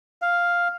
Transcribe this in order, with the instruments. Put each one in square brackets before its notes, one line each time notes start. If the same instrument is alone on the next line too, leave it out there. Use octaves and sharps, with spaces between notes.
[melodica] F5